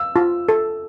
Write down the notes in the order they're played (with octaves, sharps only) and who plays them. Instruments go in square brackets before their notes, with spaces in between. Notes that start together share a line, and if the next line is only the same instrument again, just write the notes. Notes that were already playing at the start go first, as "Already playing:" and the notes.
Already playing: [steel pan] F5 [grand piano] E6
[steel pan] F4
A4